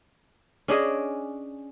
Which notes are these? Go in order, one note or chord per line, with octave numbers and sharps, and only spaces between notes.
C#4 D4 G#4 D#5